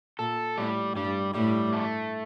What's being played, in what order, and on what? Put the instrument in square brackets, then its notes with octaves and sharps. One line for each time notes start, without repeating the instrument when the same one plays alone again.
[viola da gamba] A#2 [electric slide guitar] A4
[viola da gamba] A2 [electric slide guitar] G3
[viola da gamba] G2 [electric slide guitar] G3
[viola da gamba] A2 [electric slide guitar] G3
[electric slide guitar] A3